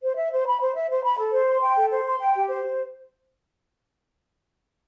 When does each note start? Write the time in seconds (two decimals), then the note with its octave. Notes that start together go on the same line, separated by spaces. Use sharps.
0.02 C5
0.16 E5
0.32 C5
0.45 B5
0.60 C5
0.75 E5
0.89 C5
1.04 B5
1.18 A4
1.33 C5
1.47 C6
1.62 G5
1.76 A4
1.91 C5
2.05 C6
2.20 G5
2.34 G4
2.49 C5